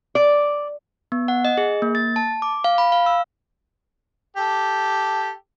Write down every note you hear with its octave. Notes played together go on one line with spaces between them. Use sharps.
D5
B3
F#5
D#5
G#4
A#3
A6
A5
D6
F5
B5
F5
E6
G4 A4